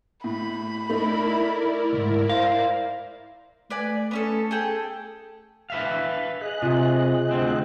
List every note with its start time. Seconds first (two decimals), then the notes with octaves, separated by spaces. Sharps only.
0.24 A2 B5
0.89 A3 D#4 E4 A#4 D5
1.93 C2 G#2
2.30 C5 F5 A#6
3.70 A3 B4 D5 G#5
4.11 B3 C#4 A4
4.51 G#4 A4 G5
5.70 B4 E5 F5
6.41 G#4 D#5 F#6
6.62 C3 F4
7.31 D2 C4